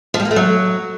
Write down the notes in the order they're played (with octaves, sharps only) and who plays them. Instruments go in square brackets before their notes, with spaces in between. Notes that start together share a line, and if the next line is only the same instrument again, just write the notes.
[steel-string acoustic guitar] F3
G3
A#3
A3
F#3